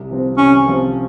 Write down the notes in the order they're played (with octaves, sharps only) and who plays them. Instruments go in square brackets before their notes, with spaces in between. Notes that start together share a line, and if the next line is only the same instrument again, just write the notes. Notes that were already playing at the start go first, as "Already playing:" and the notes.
Already playing: [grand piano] C2
C3 F3 C4
[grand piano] C2 [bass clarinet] C#4
[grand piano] C3 F3 C4